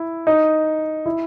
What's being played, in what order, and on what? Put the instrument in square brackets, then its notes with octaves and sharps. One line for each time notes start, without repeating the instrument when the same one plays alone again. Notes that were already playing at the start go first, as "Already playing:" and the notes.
Already playing: [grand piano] E4
D#4
E4